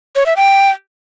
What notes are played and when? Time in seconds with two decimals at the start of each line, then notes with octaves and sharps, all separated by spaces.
0.16 C#5
0.26 E5
0.37 G5